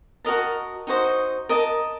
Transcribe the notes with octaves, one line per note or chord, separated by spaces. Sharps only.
F#4 A#4 D#5 A5
D#4 F#4 C5 D#5
A#4 D#5 A5